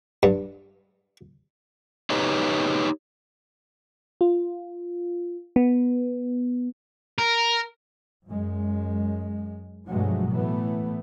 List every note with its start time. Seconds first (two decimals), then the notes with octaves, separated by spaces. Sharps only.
0.23 G2
2.10 D#4 G4 B4 C#5 D#5
4.21 F4
5.56 B3
7.18 A#4
8.28 F#2 G#3
9.88 G2 B2 F3 F#3 G#3 A3
10.31 A2 E3 A3 B3